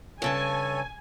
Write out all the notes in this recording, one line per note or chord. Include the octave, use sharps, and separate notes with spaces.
G2 C#3 A4 C#5 G#5 A5